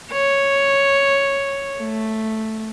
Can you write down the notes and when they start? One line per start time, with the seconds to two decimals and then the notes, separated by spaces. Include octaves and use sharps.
0.12 C#5
1.79 A3